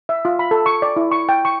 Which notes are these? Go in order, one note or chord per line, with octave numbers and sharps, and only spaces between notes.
E5
F4
B5
A4
C#6
D5
E4
C#6
G5
C#6